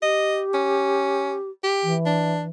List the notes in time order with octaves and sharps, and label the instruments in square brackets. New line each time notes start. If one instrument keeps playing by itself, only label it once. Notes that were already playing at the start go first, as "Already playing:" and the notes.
[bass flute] G4 [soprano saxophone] D#5
[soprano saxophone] C#4
G4
[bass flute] E3
[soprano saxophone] D4